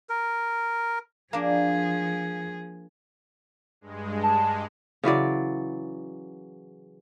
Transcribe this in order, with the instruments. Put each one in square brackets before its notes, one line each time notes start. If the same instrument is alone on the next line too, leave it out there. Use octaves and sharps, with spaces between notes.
[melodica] A#4
[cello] F3 G#4 [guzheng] A#3 D4
[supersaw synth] G2 G#3
[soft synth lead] A5
[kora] C#3 E3 F#3 D5